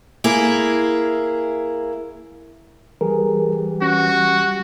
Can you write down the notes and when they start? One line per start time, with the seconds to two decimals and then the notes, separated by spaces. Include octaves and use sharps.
0.24 A#3 E4 G#4
3.01 E3 G3 G#4 A#4
3.82 C#4 F#4